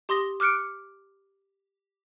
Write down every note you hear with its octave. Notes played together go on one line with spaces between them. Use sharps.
G4 C6 D#6 A#6 G7
D6 F6 F#6 C#7 D7